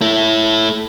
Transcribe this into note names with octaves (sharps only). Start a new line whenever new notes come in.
A3 E4